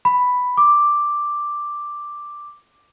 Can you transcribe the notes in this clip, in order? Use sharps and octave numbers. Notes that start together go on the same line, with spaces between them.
B5
D6